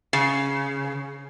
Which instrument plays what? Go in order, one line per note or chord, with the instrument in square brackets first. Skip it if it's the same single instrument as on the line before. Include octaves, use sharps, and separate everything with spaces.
[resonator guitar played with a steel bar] C#3